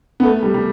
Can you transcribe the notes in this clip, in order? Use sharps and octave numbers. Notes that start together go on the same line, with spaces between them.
B3
A3
G3
G3